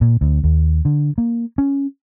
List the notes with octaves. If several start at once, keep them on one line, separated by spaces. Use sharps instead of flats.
A#2
D2
D#2
D3
A#3
C#4